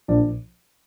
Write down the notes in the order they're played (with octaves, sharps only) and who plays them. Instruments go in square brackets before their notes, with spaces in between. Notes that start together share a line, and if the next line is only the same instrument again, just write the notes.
[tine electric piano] A#1 A#2 F3 D4 D5